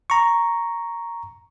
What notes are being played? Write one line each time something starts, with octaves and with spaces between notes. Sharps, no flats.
A#5 C#6